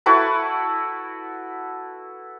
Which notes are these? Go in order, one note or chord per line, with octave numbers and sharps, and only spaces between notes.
E4 F#4 A4 B4